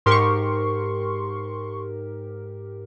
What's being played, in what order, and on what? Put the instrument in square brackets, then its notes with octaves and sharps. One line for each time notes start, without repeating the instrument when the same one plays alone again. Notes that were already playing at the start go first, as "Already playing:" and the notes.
[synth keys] G#2 G4 A#4 [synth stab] C6 C#6